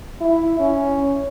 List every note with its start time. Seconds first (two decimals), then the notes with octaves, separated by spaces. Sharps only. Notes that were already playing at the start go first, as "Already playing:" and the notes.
0.21 E4
0.60 C#4